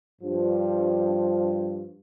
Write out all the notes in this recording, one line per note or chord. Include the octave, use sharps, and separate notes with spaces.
G2 F3